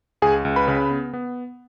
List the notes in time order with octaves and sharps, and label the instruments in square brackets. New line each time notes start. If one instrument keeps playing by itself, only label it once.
[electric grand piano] C#2 G#4 G#5
C#2
B4 B5
C#3
B3
B3